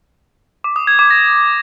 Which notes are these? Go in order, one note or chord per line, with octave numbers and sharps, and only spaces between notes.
D6
D#6
G#6
D6
A#6